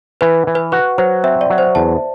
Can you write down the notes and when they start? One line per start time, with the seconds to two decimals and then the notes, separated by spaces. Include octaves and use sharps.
0.21 E3 B4
0.47 E3
0.55 B4
0.72 F#4 B4
0.98 F#3 C5
1.24 C4 E5
1.41 D5
1.50 F#3
1.58 C5
1.75 E2 A5